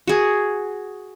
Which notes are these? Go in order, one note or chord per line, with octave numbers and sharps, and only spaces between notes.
F#4 G#4